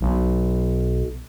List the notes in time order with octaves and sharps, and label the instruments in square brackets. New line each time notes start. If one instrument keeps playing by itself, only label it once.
[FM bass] B1